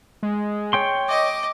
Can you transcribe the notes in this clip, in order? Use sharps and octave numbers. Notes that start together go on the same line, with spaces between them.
G#3
C#5 G5 C6
D#5 D6